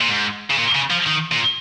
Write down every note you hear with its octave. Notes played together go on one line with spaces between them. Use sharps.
A#2
G#2
C#3
A#2
C#3
F3
D#3
A#2